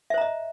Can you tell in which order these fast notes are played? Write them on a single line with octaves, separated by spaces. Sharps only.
E5 C5 A#5 D#5